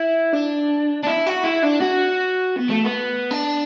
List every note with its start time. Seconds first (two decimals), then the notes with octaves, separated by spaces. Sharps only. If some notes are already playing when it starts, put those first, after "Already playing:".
Already playing: E4
0.33 D4
1.03 D4
1.07 E4
1.27 F#4
1.44 E4
1.63 D4
1.81 F#4
2.57 B3
2.70 A3
2.85 B3
3.31 D4